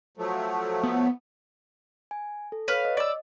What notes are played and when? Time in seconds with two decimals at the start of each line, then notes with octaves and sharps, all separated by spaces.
0.17 F3 F#3 A3
0.83 B3
2.11 G#5
2.52 A4
2.68 B4 C#5 F5
2.85 D#5
2.97 D5 E6